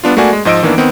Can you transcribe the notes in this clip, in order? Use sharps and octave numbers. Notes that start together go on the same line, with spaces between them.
G3 B3 D4 F4
A3 A#3 F#4 D5 G#5
G#3
G#2 F3 D#5 E6 D7
D#3 E3 A#3 B3 D4
D#3 B3 C4